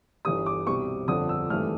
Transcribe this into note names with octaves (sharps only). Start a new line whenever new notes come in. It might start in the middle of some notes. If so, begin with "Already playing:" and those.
G1 G2 E3 G3 D#6
D6
C2 B2 G3 C4 C#6
G1 F2 D3 F3 D#6
E6
G#1 G2 E3 A3 F6